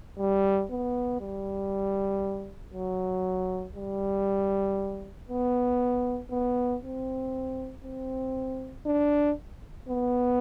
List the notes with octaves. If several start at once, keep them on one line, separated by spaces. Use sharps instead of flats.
G3
B3
G3
F#3
G3
B3
B3
C4
C4
D4
B3